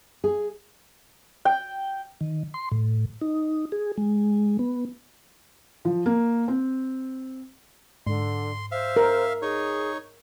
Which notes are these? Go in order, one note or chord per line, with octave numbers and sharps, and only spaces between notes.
G#4
G5
D#3
C6
A2
D#4
G#4
G#3
B3
F3
A#3
C4
G#2 D3 C6
C5 E5 F5
A#4
D#4 G#4 C#5